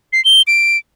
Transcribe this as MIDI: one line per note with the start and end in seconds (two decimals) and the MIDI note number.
0.13 0.23 96
0.25 0.42 103
0.47 0.77 98